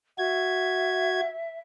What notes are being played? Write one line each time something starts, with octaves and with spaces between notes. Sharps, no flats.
F#4 E5 G#6